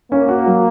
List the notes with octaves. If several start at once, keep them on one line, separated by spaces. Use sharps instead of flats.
A#3 C#4
F#4
F#3